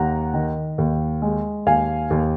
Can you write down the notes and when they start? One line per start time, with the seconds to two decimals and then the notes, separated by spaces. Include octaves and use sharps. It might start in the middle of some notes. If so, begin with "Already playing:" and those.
Already playing: D#2 F#5 A#5
0.34 D#3
0.78 D#2
1.22 G#3
1.66 D#2 F5 G#5
2.10 D#2